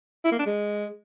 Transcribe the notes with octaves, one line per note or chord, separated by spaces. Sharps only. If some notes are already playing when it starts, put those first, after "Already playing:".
E4
A#3
D4
G#3